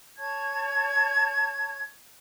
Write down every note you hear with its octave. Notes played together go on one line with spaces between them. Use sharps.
C#5 A5 C#6 G#6